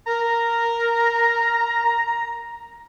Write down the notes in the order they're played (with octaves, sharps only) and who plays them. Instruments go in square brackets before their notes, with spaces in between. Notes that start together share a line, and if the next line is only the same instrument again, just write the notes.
[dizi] A#4 [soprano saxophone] A#5